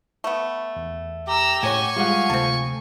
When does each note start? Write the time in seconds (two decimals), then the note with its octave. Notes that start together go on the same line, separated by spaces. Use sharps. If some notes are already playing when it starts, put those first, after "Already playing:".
0.24 A3 B3
0.76 E2
1.27 G4 A#5 E6
1.63 A2 G#3 C#4 F#4 C#5 G#5 C#6
1.97 F3 G3 G#3 F#4 F#5
2.30 D2 C3 A3 C4 A4